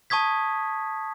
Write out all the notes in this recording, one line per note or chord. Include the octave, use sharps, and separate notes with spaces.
A5 C#6 D#6 G#6 B6